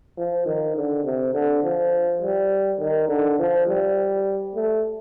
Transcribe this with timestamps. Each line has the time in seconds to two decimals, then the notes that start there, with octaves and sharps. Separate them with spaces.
0.18 F3
0.46 D#3
0.76 D3
1.04 C3
1.34 D3
1.63 F3
2.21 G3
2.80 D#3
3.08 D3
3.39 F3
3.67 G3
4.55 A3